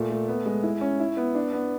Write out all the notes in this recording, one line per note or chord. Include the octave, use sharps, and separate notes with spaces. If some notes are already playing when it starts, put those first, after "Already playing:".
Already playing: A#2 A3
A3
B3
G#3
E4
C#4
E4
B3
D4
B3